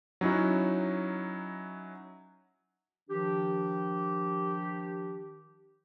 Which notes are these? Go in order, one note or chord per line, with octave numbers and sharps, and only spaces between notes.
F#3 C#4 D#4 E4 F#4
D#3 F3 D4 G4